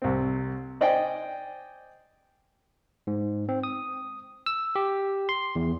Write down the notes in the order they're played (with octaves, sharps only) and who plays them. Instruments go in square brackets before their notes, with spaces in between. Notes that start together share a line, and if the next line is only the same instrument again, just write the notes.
[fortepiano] C2 C4
C5 D5 D#5 G5 G#5
[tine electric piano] G#2
C4
D#6
E6
G4
C6
E2